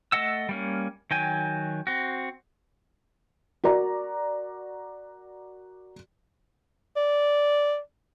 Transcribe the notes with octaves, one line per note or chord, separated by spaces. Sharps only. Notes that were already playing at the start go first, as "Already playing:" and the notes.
A3 A4 D#5 F#5 E6
G3 A#3 C#4
D#3 F#3 G5 G#5
C4 F#4
F#4 A#4 D5 A#5
D5